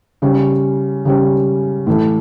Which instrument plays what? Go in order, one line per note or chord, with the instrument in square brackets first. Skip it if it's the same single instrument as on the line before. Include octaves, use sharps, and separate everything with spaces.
[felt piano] C#3 G3 C#4
C#3 G3 C#4
A2 E3 A3